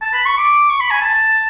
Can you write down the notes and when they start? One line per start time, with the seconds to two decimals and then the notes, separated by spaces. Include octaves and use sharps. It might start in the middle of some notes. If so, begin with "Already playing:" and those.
0.01 A5
0.13 B5
0.26 C#6
0.37 D6
0.70 C#6
0.80 B5
0.90 G#5
1.01 A5